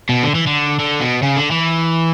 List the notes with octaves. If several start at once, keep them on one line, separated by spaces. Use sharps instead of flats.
B2
D3
E3
D3
D3
B2
C#3
D3
E3